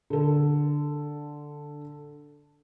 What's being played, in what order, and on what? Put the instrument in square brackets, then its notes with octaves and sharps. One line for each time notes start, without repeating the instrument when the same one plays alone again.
[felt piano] D3 A4